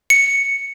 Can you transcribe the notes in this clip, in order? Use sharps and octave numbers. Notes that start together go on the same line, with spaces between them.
C#7